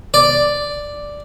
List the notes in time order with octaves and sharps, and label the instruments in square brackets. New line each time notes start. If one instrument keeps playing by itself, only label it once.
[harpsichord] D5